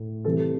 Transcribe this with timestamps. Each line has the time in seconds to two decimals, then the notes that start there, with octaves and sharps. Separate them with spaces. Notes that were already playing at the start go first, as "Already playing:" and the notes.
Already playing: A2
0.25 C3 E3 G3 A4